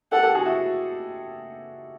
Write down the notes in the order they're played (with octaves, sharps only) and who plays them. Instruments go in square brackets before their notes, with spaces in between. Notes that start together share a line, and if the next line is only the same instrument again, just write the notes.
[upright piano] G4 A4 [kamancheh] F#5
[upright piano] G4 A4
F#4 G#4
E4 F#4